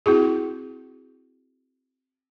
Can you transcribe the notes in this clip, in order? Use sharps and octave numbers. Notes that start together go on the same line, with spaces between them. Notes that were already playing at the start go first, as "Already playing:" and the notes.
C4 E4 F#4 G#4